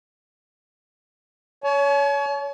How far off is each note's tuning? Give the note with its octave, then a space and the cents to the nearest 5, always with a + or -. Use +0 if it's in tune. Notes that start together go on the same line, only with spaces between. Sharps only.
C#5 +25 A5 -45